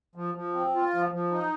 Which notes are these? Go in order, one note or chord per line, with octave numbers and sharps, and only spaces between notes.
F3
F3
C4
F4
F3
F3
D#4